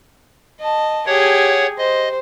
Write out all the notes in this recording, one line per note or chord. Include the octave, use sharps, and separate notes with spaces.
D#5 A5
G4 G#4 C#5 F#5
C5 D#5